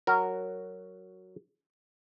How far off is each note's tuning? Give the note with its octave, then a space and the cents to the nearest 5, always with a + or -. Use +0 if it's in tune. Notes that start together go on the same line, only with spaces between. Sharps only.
F#3 +0 F#4 +0 A#4 -10